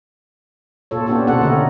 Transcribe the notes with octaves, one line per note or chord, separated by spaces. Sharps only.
A#2 F4 A4 C#5
B3 C#4 D4 F4 G4 A4
B2 C4 A4 C#5 F#5
D3 A3 A#4 D#5